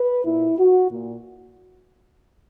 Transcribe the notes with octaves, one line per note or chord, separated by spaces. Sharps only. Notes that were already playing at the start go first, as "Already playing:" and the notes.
Already playing: B4
A#2 E4
F#4
A#2